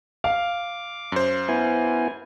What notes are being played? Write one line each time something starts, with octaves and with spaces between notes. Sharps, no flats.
F5 D6
F#2 C5
B3 E4 G#5